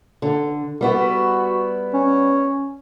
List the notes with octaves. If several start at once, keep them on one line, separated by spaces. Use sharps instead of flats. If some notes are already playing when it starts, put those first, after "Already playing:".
D3
G3 B3 E4 F#4
C#4